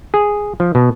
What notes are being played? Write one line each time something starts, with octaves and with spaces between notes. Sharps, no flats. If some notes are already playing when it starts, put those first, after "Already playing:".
G#4
F3
B2